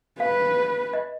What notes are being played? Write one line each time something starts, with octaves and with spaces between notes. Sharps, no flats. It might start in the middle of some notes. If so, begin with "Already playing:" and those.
B4 F5
D#5